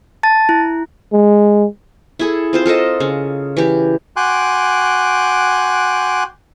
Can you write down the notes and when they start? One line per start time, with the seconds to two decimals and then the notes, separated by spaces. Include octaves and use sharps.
0.23 A5 A6
0.49 E4
1.13 G#3
2.19 E4 G#4 A4
2.53 C4 F4 C5
2.66 F4 A4 A#4 D#5
3.00 C#3
3.57 E3 G4
4.16 F#4 G5 G#5 C6 D6 F#6